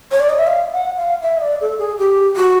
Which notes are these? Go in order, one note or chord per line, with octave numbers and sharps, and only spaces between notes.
C#5
D5
D#5
E5
F5
F#5
F5
E5
D#5
D5
A4
G#4
G4
F#4